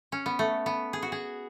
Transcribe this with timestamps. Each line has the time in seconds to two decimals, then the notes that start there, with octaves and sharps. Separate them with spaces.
0.12 C#4
0.26 B3
0.39 A3
0.66 B3
0.93 G#4
1.03 F#4
1.12 G#4